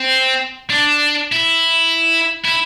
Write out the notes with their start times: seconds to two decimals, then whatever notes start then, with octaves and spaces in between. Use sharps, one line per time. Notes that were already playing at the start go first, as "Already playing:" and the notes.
Already playing: C4
0.70 D4
1.32 E4
2.45 E4